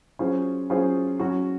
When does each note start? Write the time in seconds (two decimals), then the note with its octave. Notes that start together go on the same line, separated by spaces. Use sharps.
0.19 F#3 C#4 F4 G#4 C5
0.70 F#3 C#4 F4 G#4 C5
1.19 F#3 C#4 F#4